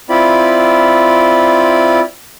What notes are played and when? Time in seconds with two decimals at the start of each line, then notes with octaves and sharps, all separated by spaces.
0.09 C4 E4 F4 D5 B5